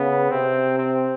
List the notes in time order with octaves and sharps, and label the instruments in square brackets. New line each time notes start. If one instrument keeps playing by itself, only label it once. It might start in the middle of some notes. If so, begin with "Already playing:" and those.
Already playing: [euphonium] C#3 [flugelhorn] B3
[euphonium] C3 [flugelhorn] C4
[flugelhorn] C4